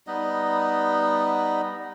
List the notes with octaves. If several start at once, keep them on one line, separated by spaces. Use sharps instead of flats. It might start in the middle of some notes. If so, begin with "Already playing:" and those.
G3 B3 D#4 D#5